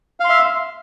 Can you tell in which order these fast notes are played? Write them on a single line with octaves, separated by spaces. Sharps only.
F5 C6 E5